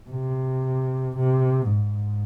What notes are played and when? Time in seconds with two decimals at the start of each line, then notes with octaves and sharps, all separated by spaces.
0.10 C3
1.17 C3
1.70 G#2